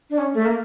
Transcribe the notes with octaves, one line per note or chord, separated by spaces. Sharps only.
D4
C#4
A3
A#3